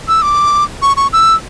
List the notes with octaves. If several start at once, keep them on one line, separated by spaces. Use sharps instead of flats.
E6
D6
C#6
C#6
E6